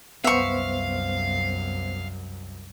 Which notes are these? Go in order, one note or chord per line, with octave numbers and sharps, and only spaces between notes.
C2 F#2 B3 C5 E5 F5 C#6